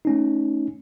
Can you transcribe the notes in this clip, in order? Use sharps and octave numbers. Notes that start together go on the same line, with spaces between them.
A3 C#4 D#4